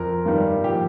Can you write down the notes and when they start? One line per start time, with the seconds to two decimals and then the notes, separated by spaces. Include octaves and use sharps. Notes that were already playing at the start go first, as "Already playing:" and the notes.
Already playing: F2 A#4
0.26 G2 D#3 G3
0.64 A#2 F3 G4